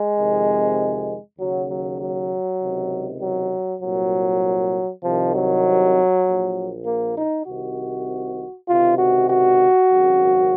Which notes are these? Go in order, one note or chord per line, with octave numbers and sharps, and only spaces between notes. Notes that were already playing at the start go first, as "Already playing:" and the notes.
Already playing: G#3
F2 C3 D#3
D#2 C#3 F#3
F#3
F#3
C#2 C3 D#3
F#3
C2 A#2 F#3
C2 C3 D#3 F3
F#3
A#1 A#2
A#3
D#4
C2 C3 D#3 F#4
C#2 C3 D#3 F4
F#4
F#4
G#1 F#2 C#3